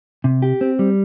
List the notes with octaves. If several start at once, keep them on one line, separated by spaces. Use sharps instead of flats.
C3
G4
C4
G3